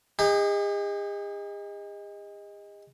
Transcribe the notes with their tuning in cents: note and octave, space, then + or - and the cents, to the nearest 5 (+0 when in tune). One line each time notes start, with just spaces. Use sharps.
D#4 +5 G#4 -45